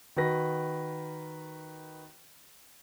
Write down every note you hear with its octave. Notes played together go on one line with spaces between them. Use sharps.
D#3 F#4 B4 A#6